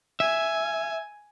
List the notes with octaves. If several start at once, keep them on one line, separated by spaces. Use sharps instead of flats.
E5 G#5